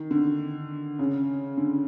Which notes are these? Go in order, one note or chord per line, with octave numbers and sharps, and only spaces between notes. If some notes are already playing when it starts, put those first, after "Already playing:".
Already playing: D#3
D3
C#3
D3